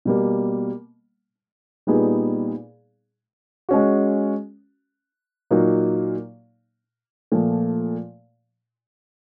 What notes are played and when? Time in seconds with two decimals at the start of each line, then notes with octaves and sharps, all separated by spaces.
0.05 B2 G3 A#3
1.87 A#2 G3 B3 D#4 G#4
3.69 G#3 C#4 F#4
5.51 A#2 F#3 A#3 D#4
7.32 A#2 F3 A3